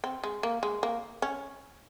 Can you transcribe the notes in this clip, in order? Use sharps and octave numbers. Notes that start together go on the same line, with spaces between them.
C4
G#3
A#3
G#3
A#3
C#4